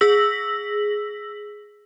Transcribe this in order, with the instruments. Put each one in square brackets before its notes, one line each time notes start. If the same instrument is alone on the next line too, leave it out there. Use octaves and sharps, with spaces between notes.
[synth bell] G#4 E6 A#6 B6 F#7